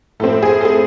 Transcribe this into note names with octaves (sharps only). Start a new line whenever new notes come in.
A2 F3 A3 C4 A4
G#4
A4
G#4